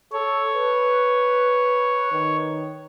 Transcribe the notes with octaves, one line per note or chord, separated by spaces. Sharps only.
A4 C#5
B4
D#3